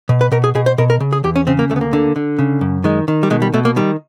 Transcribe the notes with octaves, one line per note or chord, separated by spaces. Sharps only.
B2
B4
B2 A#4
G#4
B2 G#4
C5
B2 A#4
A#4
C#3
G#4
E2 G4
C#4
C#3 C4
A#3
D2 A3
B3
A#3
D3
D3
C#3
F#2
D#3 G#3
D#3
G3
B2 G#3
G3
B2 A3
A#3
D#3 G3